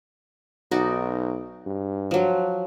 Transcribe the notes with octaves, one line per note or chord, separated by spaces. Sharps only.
B1 D#4 F#4 D5
G2
F3 F#3